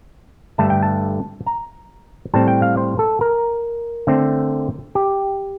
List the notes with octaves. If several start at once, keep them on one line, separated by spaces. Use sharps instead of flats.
G2 D3 A3 A5
G5
A5
A#5
A2 G3 C4 A5
G5
F5
C5
A4
A#4
D3 A3 C4
G4